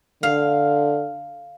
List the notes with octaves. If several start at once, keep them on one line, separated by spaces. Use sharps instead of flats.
D3 F5